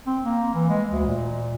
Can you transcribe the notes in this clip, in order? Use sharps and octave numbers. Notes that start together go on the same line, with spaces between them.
C4
A#3
E3
G#3
D2
A#2